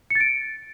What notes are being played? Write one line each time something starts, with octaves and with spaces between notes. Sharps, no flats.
A6 C#7 D7